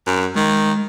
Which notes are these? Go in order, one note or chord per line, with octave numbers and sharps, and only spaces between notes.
F#2
D#3 G#3